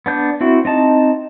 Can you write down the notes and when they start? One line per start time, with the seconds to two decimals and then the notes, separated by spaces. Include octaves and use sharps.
0.06 B3 D4 G6
0.41 C4 E4 F#4
0.65 C4 D#4 A5